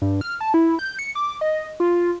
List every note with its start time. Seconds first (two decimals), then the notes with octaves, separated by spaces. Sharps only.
0.02 G2
0.21 F6
0.41 A5
0.54 E4
0.79 G6
0.99 C#7
1.15 D6
1.41 D#5
1.80 F4